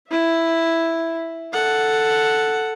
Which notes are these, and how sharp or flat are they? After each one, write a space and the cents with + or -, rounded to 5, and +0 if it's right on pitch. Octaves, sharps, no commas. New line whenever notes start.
E4 +0 E5 +0
A4 +0 F#5 +0